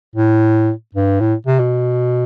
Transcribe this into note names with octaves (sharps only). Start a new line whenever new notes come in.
A2
G2
A2
C3
B2